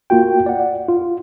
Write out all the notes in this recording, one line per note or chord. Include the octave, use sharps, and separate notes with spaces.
A#3 F4 F#4 G5
D5 F#5
F4